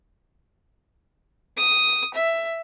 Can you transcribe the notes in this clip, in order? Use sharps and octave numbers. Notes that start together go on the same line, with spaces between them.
D#6
E5